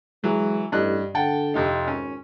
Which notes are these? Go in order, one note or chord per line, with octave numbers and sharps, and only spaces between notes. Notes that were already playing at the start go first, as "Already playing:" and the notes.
E3 F#3 G#3
A1 G2 D#5 F#6
D3 F#5 G5 A5
F2 C3 D#4
G#1 C#4